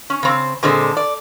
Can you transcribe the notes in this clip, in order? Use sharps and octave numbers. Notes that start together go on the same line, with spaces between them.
C#4
C#3 C4
A#2 D3 G#3 C4
D5